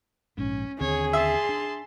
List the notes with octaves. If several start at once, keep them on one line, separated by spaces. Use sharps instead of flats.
A#1 G#2 C#4
D#2 D3 C4 G#4 C#5
E5 A5 C6
D4